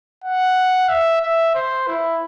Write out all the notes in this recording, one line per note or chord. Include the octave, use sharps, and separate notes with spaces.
F#5
E5
E5
C5
E4